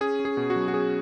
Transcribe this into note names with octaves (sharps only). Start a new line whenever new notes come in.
C#4 G#4
C#4
G#4
B2
F#4
F#3
F#4
C#4 G#4